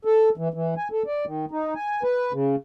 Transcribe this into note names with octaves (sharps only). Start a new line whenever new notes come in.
A4
E3
E3
G#5
A4
D5
D#3
D#4
G#5
B4
C#3